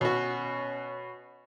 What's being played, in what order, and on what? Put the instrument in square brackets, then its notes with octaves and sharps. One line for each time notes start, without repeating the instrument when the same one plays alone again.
[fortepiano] B2 F#4 [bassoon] C#4